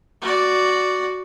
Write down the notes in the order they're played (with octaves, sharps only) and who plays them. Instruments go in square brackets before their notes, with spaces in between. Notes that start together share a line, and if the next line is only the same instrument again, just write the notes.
[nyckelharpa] F#4 D5